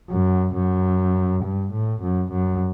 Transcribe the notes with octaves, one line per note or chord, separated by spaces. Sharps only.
F#2
F#2
G2
A2
F#2
F#2